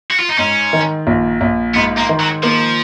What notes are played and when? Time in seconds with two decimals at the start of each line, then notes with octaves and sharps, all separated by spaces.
0.11 F#4
0.19 F4
0.29 D#4
0.38 G#2 C#4
0.73 D#3
1.07 A#1
1.41 A#1
1.75 G#2 B3
1.98 A#3
2.09 D#3
2.20 F#3
2.43 F3 A#3